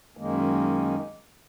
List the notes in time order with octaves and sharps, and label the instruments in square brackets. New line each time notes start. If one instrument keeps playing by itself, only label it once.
[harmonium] F#2 D#3 G#3 A#3